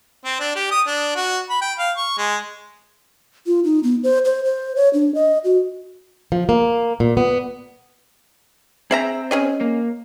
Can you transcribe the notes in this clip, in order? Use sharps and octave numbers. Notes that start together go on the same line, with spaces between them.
C4
D4
G4
D#6
D4
F#4
B5
G5
F5
C#6
G#3
F4
D#4
B3
C5
C5
C5
C#5
D4
D#5
F#4
F3
A#3
A#2
B3
C4 G#4 E5 A#5
C#4 G#4 D#5
A#3